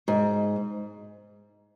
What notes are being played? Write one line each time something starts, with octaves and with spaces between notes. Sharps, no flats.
G#2